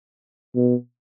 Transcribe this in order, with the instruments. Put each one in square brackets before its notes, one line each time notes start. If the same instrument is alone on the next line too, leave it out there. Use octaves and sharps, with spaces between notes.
[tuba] B2